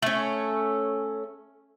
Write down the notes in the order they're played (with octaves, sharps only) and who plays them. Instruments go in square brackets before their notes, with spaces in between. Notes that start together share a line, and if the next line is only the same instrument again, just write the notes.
[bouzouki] A3 C#4